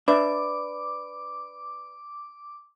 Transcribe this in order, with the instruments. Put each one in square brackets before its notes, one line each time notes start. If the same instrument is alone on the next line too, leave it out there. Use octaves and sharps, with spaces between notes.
[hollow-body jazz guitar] D4 E5 [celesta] B4 D5 B5 [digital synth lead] D6